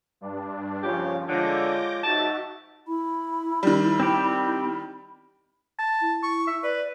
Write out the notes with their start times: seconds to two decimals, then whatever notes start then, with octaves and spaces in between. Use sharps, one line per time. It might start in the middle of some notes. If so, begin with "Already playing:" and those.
0.21 G2 D4
0.83 A#2 C#3 F3 F4 G4 C#5
1.27 D3 G#3 F4 C#5 D6 G6 A#6
2.04 G#2 D#4 F#4 E5 A5
2.88 E4 B5
3.63 D#3 G3
4.00 C4 G4
5.79 A5
6.01 E4
6.23 C#6
6.47 E5
6.63 B4 D5